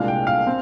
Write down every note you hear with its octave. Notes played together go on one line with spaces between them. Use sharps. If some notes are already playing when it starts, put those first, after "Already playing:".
Already playing: C2 A#2 G#3 D4 F5
G5
F5
C4